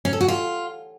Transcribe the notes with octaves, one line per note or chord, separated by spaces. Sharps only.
C#4
A4
F#4
F4